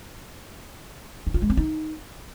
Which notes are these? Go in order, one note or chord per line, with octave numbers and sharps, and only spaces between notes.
D#4
F4
G#3
C4
D#4